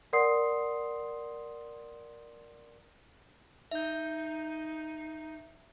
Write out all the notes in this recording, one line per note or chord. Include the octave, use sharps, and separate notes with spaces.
A#4 D5 F#5 C6 D#6 C7
D#4 E5 G6